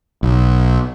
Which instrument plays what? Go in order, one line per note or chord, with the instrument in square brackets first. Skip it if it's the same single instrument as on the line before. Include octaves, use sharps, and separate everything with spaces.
[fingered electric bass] B1